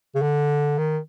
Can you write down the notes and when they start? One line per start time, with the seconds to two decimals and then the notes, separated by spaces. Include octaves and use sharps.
0.15 C#3
0.22 D3
0.78 D#3